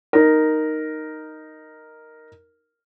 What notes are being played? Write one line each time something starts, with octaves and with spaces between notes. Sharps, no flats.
D#4 A#4